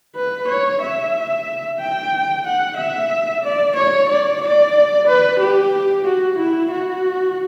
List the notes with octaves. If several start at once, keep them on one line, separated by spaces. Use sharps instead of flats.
B4
C#5
E5
G5
F#5
E5
D5
C#5
D5
D5
B4
G4
F#4
E4
F#4